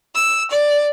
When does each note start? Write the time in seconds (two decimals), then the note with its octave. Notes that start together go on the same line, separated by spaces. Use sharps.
0.16 E6
0.51 D5